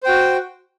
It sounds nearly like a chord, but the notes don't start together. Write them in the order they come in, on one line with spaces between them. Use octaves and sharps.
C5 G5 F#4